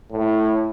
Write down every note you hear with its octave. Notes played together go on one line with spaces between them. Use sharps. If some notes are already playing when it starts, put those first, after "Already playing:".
A2